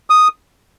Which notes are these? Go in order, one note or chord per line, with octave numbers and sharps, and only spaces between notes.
D#6